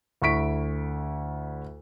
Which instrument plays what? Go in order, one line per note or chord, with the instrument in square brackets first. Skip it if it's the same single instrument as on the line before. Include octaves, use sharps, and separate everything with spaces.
[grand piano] D2 E4 C#6 B6 D7